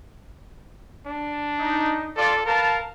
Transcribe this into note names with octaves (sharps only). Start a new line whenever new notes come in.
D4
D#4
F4 A4 D5
A#4 B4 F5 A5